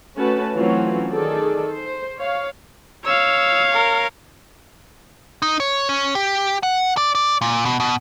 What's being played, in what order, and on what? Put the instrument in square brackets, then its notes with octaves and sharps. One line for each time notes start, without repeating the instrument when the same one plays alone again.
[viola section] A3 C#4 F#4 B4 A5
E3 F#3 A3 C4 C#4 F4
D#3 G#4 A4 D5
C5
C#5 F5
[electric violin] C#5 F5 [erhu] E6
[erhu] A#4
[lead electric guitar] D#4
C#5
C#4
G4
F#5
D5
D5
A#2
B2
B2